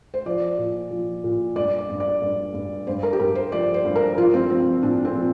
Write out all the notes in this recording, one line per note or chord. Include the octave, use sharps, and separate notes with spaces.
C5
F3 D5
A#2
F3
A#2
G2 D5
D5
G2
D5
G2
G2
G2 C5
A#4
G4
G2 A#4
C5
F3 D5
C5
G2
A#4
F3 F4
C4
F3 C4
A#2 D4
C4
F3